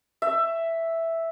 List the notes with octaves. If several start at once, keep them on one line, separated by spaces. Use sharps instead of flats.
E5